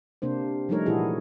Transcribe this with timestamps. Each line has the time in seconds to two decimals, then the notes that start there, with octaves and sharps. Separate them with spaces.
0.22 C3 A#3 D4 C5
0.69 F3 G3 A3 D#4 A#4 C#5
0.86 A#2 E3 E4 F#4 G#4 A4